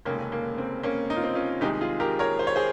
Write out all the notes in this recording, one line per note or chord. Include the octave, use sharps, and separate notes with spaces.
F1 D#2 C#3 G#3 A#3 C#4
A#3
C4
A#3 C#4
D#4
F4
C4 D#4
C#4 F4
C2 C3 D#3 G#3 D#4 G4
F4 G#4
G4 A#4
A#4 C#5
C5
C#5
G#4 C5